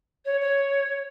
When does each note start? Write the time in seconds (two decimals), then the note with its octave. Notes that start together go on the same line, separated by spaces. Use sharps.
0.25 C#5
0.40 C#5